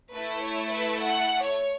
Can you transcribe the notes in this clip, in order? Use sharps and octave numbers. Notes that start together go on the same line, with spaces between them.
A3 E4 A4 B4
C#5
B4
F#5
C#5